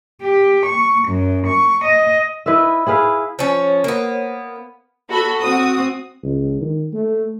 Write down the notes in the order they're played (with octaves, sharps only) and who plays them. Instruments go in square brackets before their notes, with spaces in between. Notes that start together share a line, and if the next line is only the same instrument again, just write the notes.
[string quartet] G4
C#6
F#2
C#6
D#5
[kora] E4 B4 D#5 E5
E4 G#4 B4 F5
[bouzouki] F3 C#4 [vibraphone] C5 C#5
[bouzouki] A#3 B3
[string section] F#4 A4 B5
[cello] C4 [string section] F#4 D#6
[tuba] C#2
D#3
A3